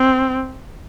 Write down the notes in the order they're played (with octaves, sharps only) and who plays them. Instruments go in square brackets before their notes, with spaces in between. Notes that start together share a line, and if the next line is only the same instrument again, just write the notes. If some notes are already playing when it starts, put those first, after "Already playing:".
Already playing: [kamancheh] C4